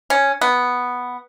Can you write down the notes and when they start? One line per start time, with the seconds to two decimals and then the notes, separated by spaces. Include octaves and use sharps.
0.10 C#4
0.41 B3